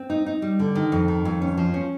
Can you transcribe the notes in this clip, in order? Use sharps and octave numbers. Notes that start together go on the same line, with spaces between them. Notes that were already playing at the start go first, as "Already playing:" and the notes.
Already playing: C4
D#4
D#4
G3
D3
D#3
F2
D#3
F2
C#4
F3
C#4